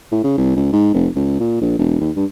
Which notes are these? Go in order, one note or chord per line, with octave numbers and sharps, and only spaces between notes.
A2
C#3
C2
C#2
G#2
F1
C#2
A#2
A#1
E1
D#2
G2